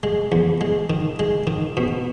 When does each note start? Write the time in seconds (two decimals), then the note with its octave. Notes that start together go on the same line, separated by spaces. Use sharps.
0.03 G#3
0.32 E2
0.61 G#3
0.90 D#3
1.19 G#3
1.47 D#3
1.77 B2